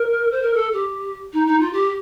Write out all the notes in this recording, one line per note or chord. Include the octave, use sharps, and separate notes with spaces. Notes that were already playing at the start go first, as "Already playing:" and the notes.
Already playing: A#4
C5
A#4
A4
G4
D#4
D#4
F4
G4